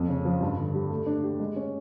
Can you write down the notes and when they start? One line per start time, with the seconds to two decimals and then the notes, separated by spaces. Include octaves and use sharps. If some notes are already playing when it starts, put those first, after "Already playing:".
Already playing: F2
0.08 C#3
0.25 F3
0.41 G2
0.57 D3
0.75 G3
0.90 A3
1.06 D4
1.24 G4
1.40 G#3
1.56 C#4